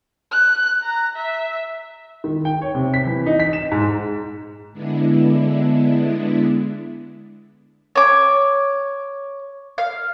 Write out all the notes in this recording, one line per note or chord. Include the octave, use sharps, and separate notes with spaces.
F#6
A#5
E5
D#3
G5
C#5
C3
B6
E3
D#4
B6
E7
G#2
D3 G#3 B3 D4 E4
C#5 D6
F5